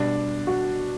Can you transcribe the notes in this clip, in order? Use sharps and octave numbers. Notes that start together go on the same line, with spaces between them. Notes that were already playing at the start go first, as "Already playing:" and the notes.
Already playing: B2 G3 D4
F#4